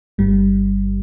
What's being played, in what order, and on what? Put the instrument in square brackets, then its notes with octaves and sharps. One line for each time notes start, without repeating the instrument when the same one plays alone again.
[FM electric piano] G1 G2 G3